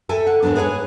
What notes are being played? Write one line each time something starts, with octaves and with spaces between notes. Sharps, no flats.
A4 E5 G5 G#5
F#5
D#2 G#2 F#3 B3 D4
G#4 B4 C#5 F#5 G#5